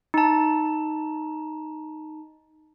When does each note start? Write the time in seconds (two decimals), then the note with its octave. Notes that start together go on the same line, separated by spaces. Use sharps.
0.14 D#4 A5